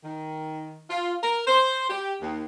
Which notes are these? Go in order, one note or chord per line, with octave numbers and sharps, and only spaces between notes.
D#3
F4
A#4
C5
G4
D#2